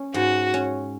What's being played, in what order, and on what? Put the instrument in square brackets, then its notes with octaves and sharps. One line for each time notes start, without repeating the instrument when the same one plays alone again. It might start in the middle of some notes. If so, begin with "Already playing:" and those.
Already playing: [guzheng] C#4
[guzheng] G#2 [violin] F#4
[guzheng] C#4